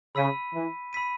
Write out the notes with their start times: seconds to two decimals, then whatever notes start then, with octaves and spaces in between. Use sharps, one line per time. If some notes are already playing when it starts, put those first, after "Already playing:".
0.15 C#3 B5 E6 B6 D#7
0.54 E3
0.93 B5 E6 B6 D#7